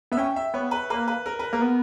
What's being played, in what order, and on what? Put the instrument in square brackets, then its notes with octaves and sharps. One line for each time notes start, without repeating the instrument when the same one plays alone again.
[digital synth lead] B3 [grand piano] E5
[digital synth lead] C#4 [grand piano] G5
[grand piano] E5
[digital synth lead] B3 [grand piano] C#5
[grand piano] B4
[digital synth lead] A#3 [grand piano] B4
[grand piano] B4
A#4
B4
[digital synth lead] A#3 [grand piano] A#4
[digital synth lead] B3